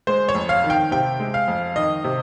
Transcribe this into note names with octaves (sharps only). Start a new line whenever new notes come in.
G#3 C5
C#5
F2
F5
D#3
G5
C3 G5
G#3
F5
F2
D#3 D#5
C3